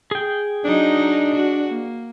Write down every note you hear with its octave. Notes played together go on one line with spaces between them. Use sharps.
G#4 G5
F#3 D4 D#4 D#5
F#4
A#3